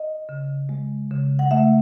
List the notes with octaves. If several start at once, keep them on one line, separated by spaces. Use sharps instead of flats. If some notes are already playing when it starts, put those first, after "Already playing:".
Already playing: D#5
C#3
G#3
C#3
F#5
A3 E5